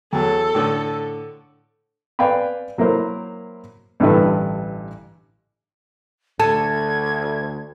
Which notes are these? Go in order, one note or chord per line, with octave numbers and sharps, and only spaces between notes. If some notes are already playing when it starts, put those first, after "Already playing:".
E2 F#3 A4
A2 D3
B4 D5 F5 G5 G#5 B5
F#3 A#3 E4 A#4 C5
A1 G2 D3 E4 A4 B4
D2 A4 A5 G#6